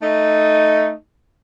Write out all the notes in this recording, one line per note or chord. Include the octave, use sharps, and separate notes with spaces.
A3 D#4